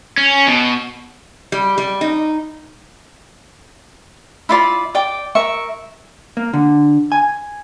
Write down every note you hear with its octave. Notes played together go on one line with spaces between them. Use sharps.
C#4
B2
G3
G3
D#4
E4 F4 D5 B5
D5 G5 D6
A#4 E5 C#6
A#3
D3
G#5